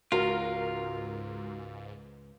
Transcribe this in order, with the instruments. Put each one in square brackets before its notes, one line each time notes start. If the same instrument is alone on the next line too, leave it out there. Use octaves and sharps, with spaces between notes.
[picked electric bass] C#2 [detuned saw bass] G#2 [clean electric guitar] F4 [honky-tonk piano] F#4 A#4